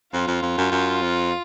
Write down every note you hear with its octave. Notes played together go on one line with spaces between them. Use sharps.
F2 F4
F2
F2
F#2
F#2
F2